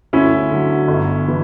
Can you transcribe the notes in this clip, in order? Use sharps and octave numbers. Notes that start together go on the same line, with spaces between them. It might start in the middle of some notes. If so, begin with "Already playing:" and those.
D2 C#4 E4
D3 F#3
G1
E3